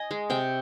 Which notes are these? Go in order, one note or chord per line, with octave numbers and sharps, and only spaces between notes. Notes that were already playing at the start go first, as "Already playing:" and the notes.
Already playing: D#5 G#5
G#3
C3 G5